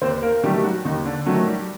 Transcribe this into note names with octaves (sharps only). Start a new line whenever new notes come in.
D#2 C4 C5
A#3 A#4
D#3 F#3 G3 A3 G4
F#3 F#4
D#2 D#3 D#4
D3 D4
D#3 F#3 A3 F#4
G3 G4